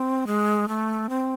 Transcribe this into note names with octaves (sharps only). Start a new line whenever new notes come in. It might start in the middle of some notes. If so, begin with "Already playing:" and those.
Already playing: C4
G#3
A3
C4